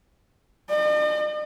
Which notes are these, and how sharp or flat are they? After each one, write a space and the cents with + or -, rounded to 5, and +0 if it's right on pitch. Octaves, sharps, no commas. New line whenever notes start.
D#5 -45